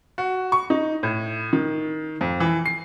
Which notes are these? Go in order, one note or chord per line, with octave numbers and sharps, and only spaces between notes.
F#4
C#6
D#4
A2
D#3
F2
E3
C7